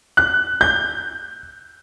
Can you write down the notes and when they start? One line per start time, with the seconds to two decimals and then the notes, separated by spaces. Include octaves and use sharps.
0.17 F#6
0.61 G6